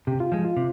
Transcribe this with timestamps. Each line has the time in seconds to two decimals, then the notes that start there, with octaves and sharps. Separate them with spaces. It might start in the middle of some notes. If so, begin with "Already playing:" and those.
0.07 C3 G4
0.20 F4
0.32 F3 G#3
0.45 F4
0.57 C3